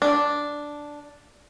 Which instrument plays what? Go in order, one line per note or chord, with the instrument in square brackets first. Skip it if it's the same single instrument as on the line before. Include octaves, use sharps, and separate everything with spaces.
[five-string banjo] D4